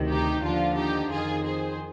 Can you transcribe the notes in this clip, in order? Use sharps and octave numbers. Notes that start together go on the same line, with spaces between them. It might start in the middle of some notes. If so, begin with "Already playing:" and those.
Already playing: D2 C3 D#3
D#4 G4
D#2 D3 F3 D4 F4
D#4 G4
F2 D#3 F4 G#4
G#4 C5